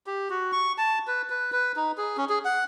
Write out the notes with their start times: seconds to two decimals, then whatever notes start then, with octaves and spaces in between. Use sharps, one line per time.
0.07 G4
0.30 F#4
0.52 C#6
0.78 A5
1.07 B4
1.30 B4
1.52 B4
1.76 D#4
1.98 G#4
2.17 C#4
2.29 G#4
2.45 F#5